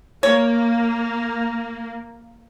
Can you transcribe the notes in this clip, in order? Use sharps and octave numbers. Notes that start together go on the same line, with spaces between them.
A#3 C#5